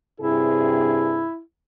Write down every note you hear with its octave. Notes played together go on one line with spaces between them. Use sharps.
G2 C3 E4 G#4